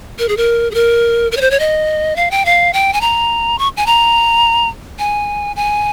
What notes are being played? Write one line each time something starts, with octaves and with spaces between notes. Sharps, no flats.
A#4
G#4
A#4
G#4
A#4
A#4
C#5
C5
C#5
D#5
F5
G5
F5
G5
G#5
A#5
C#6
G#5
A#5
G#5
G#5